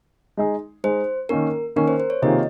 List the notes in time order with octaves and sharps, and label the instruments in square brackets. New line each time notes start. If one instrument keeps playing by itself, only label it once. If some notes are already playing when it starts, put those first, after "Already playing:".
[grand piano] G#3 D#4 G#4
[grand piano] G#3 D#4 G#4 [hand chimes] C5
[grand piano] D#3 A#3 C#4 [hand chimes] A#4
[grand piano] D#3 A#3 C#4 [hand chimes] A#4
[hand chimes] C5
C5
C#5
[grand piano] C3 D#3 A#3 F4 G#4 [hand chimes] D#5